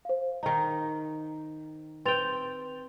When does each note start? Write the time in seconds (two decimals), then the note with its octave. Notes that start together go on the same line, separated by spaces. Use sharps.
0.05 C5 F5
0.43 D#3 D#4
2.05 C4 B4 G5 A6 F7